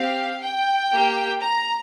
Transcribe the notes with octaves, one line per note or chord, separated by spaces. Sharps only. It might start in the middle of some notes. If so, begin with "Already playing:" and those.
Already playing: C4 G4 F5
G5
A#3 G4
A#5